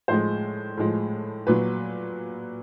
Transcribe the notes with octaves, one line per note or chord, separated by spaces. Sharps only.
A2 F3 G#3 C5
A2 F3 G#3
A#2 F#3 B4